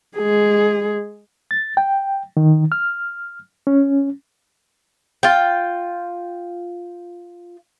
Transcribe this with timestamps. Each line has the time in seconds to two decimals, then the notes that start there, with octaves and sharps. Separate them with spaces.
0.17 G#3 G#4
1.51 A6
1.77 G5
2.37 D#3
2.72 F6
3.67 C#4
5.23 F4 G5